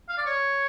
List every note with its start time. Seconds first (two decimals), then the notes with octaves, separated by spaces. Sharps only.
0.09 F5
0.18 D5
0.26 C#5